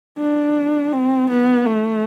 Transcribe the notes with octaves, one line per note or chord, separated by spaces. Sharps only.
D4
C4
B3
A3